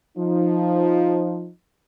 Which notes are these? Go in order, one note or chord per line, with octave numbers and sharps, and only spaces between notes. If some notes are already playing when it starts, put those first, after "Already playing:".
F3 D#4